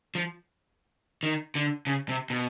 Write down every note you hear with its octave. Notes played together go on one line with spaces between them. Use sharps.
F3
D#3
D3
C#3
C3
B2